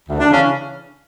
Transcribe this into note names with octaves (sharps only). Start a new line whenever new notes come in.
D2
D4
C#3 E3 C#4